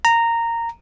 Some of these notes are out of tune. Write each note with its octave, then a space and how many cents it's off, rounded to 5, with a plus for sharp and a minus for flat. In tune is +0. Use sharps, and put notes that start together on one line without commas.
A#5 -10